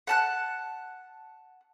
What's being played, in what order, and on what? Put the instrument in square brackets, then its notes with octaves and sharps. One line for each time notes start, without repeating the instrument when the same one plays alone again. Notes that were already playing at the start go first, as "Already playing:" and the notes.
[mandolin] F#5 A5 F#6